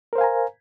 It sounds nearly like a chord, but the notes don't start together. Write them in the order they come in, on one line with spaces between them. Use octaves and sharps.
A#4 C5 F5 G#5 A#5